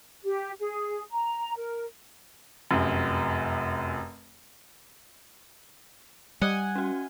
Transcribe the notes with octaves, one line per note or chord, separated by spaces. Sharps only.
G4
G#4
A#5
A#4
F1 F#2
G3 D#5 F#5 G#5
C#4 F#4